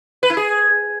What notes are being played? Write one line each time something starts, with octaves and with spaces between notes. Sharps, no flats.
B4
E4
G#4